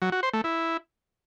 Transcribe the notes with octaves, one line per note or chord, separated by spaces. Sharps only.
F#3
F#4
C5
A3
E4